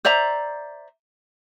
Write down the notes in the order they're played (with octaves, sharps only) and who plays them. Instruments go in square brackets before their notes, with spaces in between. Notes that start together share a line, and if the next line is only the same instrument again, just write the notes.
[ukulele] C5 D5 E5 A#5